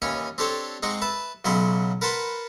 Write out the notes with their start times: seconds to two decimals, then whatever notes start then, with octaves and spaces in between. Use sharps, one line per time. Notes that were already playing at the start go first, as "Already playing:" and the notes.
0.02 D#2 E3 C#4 C#5 G#5
0.38 C4 D4 G4 A4 C5 C#5
0.83 G#3 C4 D#4 F#5 C#6
1.02 B4 E5 A5
1.45 B1 C#3 F#3 E4 C6 C#6
2.01 A#4 B4 F#5 A5 B5 C6